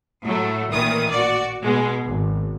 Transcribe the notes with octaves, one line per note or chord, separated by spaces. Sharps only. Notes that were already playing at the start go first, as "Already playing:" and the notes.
A2 F#3 A3
A1 A#2 D#3 E3 D#6
F#4 D5
B2 G#3
G#1